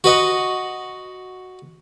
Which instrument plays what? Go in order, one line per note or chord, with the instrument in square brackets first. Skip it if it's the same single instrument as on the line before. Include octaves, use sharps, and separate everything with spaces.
[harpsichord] F#4 B4 D#5 F#5